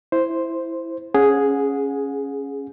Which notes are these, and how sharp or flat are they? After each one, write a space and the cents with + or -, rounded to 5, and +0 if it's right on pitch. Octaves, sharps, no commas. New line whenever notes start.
E4 +0 C5 +0
C#4 +0 G#4 +0 F#5 -30